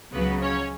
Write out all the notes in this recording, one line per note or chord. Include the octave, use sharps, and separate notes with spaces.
C#2 C#3 F#3 B3 B4
C#4 C#5